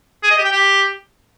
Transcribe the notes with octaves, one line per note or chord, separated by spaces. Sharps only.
G#4
D#5
G4
G5
G4